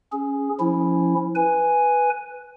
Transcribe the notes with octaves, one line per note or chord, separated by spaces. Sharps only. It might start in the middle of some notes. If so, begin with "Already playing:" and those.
C#4 G#4
F3 C#4 E4
B4 G#5